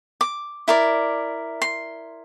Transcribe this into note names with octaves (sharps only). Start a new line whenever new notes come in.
D6
E4 A#4 D5
C6